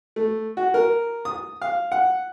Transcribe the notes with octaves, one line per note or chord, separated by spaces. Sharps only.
A3
F#4
A#4
D#6
F5
F#5